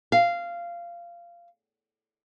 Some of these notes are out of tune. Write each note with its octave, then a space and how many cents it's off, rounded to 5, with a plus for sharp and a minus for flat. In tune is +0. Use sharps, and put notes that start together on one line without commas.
F5 -15